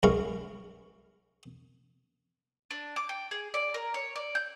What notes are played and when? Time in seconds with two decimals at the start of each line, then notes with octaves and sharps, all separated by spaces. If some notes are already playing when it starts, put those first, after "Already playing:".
0.03 B1 F#2 G#3 F5 C#6
2.71 D4
2.96 D6
3.09 G5
3.31 G#4
3.54 D5
3.74 A#4
3.94 C#5
4.16 D5
4.35 G6